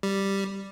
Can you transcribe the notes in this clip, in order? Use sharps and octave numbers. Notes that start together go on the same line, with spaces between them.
G3